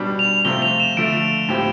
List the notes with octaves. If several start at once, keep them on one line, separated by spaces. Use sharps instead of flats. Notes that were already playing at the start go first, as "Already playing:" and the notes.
Already playing: B2 G3 D4
F7
C3 F3 A3 C4 F4 G7
F7
E7
D3 F3 A3 D7
A2 F3 C4 G4